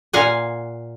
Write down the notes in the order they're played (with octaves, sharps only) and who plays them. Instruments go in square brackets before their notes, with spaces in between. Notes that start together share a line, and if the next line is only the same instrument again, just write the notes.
[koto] A#2 F5 F#5 G#5